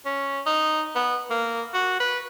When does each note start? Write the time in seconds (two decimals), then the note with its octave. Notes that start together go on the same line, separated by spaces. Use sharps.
0.05 C#4
0.46 D#4
0.96 B3
1.30 A#3
1.74 F#4
2.00 B4